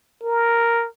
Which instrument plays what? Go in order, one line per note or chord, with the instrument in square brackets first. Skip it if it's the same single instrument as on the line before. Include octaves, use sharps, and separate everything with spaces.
[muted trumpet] A#4